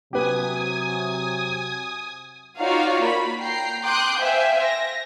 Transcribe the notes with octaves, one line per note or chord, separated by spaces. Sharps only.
C3 F#3 G4 B4 G#5 D#6
D#4 F4 F#4 C#5 D5 F5
A#3 B5
G5 A#5 C7
G5 C6 D6 D#6 F#6 G6
C5 E5 F5 G5 G#5
A#6